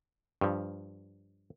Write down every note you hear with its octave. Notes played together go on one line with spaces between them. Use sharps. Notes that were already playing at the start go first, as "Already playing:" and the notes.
G2 F3